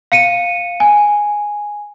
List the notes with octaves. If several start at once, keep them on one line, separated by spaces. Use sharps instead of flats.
F5 C#7 D#7
G#5